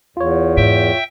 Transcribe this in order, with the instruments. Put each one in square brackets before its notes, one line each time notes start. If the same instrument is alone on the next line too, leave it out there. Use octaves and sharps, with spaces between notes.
[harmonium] E2 [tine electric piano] F4 C#5
[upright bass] G#2 [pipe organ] E5 G5